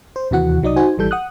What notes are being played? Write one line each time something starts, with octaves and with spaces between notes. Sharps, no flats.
C5
D#2 C3 E3 F#4 F#5
C2 F#3 D#4 D5 D#6
D#4 F#4 C5 G#5
G#1 E3 G3 A4 G6
F#5 D#6 F#6